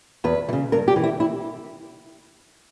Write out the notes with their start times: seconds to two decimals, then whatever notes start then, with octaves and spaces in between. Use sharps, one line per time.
0.24 E2 B4
0.49 E3
0.53 C#3
0.72 G2 A#4
0.88 G4
0.96 E3
1.04 E4
1.20 E4